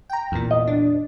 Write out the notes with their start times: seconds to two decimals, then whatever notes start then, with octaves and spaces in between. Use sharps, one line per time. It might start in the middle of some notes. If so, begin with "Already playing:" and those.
0.10 G5 A#5
0.32 E2 A#2
0.51 C2 D#5
0.68 D4